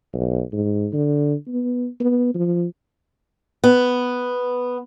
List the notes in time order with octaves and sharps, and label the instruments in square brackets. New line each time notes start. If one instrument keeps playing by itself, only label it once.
[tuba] B1
G#2
D3
B3
B3
F3
[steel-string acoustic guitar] B3